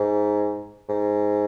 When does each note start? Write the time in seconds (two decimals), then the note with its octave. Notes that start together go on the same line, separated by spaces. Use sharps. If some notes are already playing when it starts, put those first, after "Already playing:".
Already playing: G#2
0.89 G#2